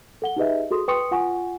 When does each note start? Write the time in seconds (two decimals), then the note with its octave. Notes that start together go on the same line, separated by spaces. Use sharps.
0.22 A4 F#5 G7
0.36 D#4 G4 G#4 B4 D#5 E5
0.71 F#4 G#4 A4 C6 D#6
0.88 B4 G5 C6 C#6 D#6 C#7
1.11 F4 F#5 G#5 C#6